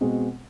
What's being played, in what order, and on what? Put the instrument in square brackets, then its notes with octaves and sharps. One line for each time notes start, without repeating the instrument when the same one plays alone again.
[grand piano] B2 G#3 C4